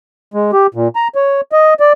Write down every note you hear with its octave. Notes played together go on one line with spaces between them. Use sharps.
G#3
G4
A#2
A#5
C#5
D#5
D5